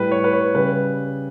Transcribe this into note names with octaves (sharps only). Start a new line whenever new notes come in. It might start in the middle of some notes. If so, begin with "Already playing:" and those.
Already playing: A2 G3 B4
C#5
B4
C#5
C#3 G3 B4